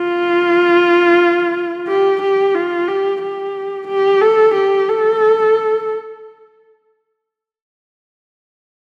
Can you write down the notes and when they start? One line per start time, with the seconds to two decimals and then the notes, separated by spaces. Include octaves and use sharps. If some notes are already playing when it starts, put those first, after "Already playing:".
Already playing: F4
1.88 G4
2.22 G4
2.54 F4
2.88 G4
3.21 G4
3.88 G4
4.21 A4
4.55 G4
4.88 A4